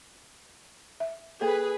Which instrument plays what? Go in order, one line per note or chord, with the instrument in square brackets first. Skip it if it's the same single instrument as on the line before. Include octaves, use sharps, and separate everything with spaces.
[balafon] E5
[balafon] A#3 A4 [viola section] G#4 B4